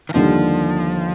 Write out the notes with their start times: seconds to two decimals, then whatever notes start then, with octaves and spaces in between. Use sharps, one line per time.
0.09 D#3
0.14 D#2 D3 F3 G3